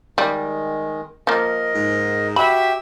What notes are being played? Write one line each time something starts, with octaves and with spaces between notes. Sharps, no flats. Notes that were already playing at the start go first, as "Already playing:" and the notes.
D#3 G3 G#3
F3 A#3 A#4 D#5
G#2
F#4 G4 E5 B5